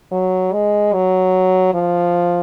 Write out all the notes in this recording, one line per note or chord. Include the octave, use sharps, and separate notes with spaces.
F#3
G#3
F#3
F3